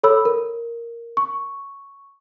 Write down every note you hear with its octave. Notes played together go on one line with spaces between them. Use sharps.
A4 C#5 B5 E6
A#4
C#6